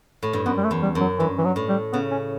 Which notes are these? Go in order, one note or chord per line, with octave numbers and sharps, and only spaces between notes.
A2
G2
F#2 B3
G3
A3
E2
G3
F#2
F#3
G2 E3
E3
F#3
A2
G3
C#3 B3
C#4